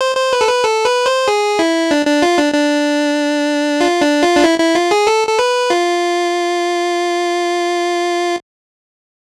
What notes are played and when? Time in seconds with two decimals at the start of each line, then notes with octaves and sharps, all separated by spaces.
0.01 C5
0.17 C5
0.33 B4
0.41 A4
0.48 B4
0.64 A4
0.85 B4
1.06 C5
1.28 G#4
1.59 E4
1.91 D4
2.07 D4
2.22 F4
2.38 D4
2.54 D4
3.80 F4
4.01 D4
4.23 F4
4.35 D4
4.44 E4
4.59 E4
4.75 F4
4.91 G#4
5.07 A4
5.28 A4
5.39 B4
5.70 F4